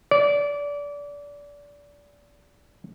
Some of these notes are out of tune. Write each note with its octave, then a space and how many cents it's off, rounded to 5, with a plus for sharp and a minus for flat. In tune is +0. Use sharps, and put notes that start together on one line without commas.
D5 -25